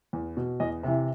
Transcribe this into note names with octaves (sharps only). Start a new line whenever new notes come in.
E2
B2
E2 D#5
C3 E3 E5